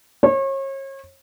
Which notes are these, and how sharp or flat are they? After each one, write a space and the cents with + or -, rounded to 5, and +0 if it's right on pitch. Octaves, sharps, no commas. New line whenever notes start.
C#5 -35